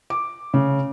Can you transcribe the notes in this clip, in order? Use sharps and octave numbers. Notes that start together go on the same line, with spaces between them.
D6
C#3